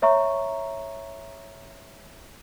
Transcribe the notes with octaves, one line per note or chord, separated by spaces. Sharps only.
C#5 E5 A#5 C#6